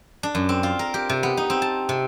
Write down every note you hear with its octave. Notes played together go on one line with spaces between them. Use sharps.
D4
F#2
C4
F4
A#4
G4
C3
B3
D#4
C4
A5
C3